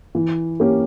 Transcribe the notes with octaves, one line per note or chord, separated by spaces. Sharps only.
E3
A#3 C#4 G4